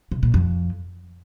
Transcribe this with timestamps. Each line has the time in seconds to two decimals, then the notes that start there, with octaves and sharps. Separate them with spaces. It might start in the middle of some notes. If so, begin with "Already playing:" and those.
0.11 C3
0.23 A#2
0.34 F2